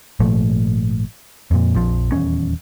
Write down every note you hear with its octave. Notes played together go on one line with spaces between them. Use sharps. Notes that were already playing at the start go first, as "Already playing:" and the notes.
G#1 A#2 F3 A3
F2 A#2
A#1 F2 F3
D#1 E2 C#4